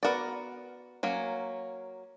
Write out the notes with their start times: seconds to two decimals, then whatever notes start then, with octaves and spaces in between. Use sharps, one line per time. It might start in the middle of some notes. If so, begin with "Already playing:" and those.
0.03 B3 F#4 A#4 D5
1.03 F#3 A#3 C#4